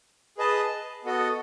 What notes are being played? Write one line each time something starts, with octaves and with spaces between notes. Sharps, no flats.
G#4 B4 D#5 A5
B3 F#4 A4 D#5